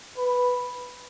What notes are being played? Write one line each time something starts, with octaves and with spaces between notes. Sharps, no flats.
B4